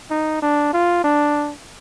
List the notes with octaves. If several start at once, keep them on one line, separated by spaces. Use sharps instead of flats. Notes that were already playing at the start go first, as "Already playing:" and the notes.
D#4
D4
F4
D4